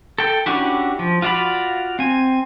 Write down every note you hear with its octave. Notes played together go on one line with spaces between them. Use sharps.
A4 G5
C#4 D4 E4 F#4 G4
F3
F4 F#4 D5 F5 B5
C4 G#5